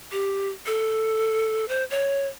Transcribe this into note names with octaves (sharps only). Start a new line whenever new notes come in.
G4
A4
C5
C#5